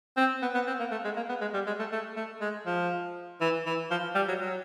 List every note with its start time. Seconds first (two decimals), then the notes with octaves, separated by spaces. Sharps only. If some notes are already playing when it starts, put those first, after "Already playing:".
0.17 C4
0.42 B3
0.55 B3
0.67 C4
0.80 A#3
0.92 A3
1.05 G#3
1.17 A#3
1.29 B3
1.42 G#3
1.54 G3
1.67 G#3
1.79 A3
1.92 A3
2.16 A3
2.41 G#3
2.66 F3
3.41 E3
3.66 E3
3.91 F3
4.16 G3
4.28 F#3
4.40 F#3